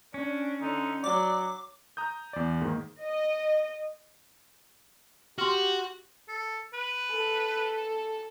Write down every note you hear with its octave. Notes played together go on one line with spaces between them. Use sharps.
C#4 D4
D3 D#4
F#3 D5 D6
A#5 D#6 G6
E2 D5
G#2 D#3 A#3
D#5
F#4 G4 C6 F6
A4
B4
A4